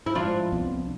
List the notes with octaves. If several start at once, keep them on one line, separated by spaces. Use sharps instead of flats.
E4
A2 F3 G#3 D4 F4
C2 C3 F3 B3